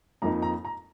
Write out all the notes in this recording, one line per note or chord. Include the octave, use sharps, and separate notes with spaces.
F2 F3 A#3 D#4 A#5
A#5
A#5